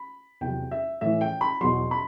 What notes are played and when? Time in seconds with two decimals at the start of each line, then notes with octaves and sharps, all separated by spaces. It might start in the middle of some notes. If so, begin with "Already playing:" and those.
Already playing: B5
0.41 E2 C3 F#3 G5
0.71 E5
1.01 A2 E3 E5
1.21 G5
1.41 B5
1.61 E2 B2 F#3 C6
1.91 B5